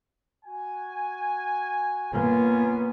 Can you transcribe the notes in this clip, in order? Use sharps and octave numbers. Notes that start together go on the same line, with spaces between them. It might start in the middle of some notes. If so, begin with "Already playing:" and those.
F#4 G#5
A#3 B3 C#4 F4 G#5